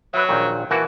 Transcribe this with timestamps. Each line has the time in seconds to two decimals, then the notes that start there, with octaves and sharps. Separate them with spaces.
0.14 F#3 B4 E5
0.29 A#1 A#2 D#3
0.71 E3 A#3 F#4 A5